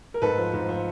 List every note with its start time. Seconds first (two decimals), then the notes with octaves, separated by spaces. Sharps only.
0.14 A#4
0.22 G#2 A4 B4
0.38 F3
0.54 G#2
0.69 F3